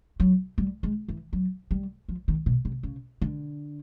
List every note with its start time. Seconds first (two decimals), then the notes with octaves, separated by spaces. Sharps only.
0.20 F#3
0.58 G3
0.83 G#3
1.08 E3
1.33 F#3
1.71 G3
2.08 F3
2.28 D#3
2.46 B2
2.65 C3
2.83 C#3
3.22 D3